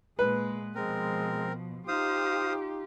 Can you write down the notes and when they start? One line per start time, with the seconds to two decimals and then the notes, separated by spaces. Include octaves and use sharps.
0.19 A#2 G#3 B4
0.75 B2 F3 G#3 C4 A#4
1.88 D#4 F4 G4 C5 F5 D#6